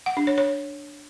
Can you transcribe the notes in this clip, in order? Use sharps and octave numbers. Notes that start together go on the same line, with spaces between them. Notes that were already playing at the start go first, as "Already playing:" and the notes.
F#5
D4
C#5
C#5